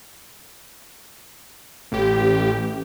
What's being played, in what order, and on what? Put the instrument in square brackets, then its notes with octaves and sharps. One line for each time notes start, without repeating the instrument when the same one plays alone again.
[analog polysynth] A1 G4